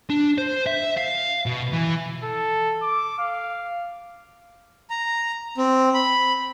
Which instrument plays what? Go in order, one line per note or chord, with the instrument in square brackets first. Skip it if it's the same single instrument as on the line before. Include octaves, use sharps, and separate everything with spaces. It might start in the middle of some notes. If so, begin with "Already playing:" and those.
[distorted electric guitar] D4
C5
E5
F5
B2
E3
[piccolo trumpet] A4
D6
F5
[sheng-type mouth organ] A#5
C4
B5